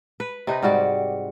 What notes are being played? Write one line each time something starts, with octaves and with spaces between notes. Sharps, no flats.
B4
C3 D#4 B4
G#2 G3 F#4 D5